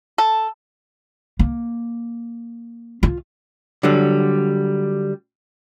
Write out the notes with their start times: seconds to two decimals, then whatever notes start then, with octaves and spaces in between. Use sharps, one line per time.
0.18 A4
1.39 A#3
3.03 F4
3.83 D3 F#3 G3